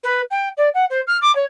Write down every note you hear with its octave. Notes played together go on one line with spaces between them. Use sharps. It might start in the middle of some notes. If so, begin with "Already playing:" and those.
B4
G5
D5
F#5
C5
F6
D6
C#5